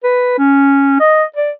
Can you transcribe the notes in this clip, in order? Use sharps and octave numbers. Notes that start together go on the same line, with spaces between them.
B4
C#4
D#5
D5